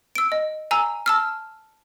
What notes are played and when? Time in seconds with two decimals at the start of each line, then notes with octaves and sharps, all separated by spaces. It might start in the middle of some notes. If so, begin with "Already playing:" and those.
0.15 E6 D7
0.32 D#5
0.71 G#5 A#5 E6
1.06 A5 E6 F6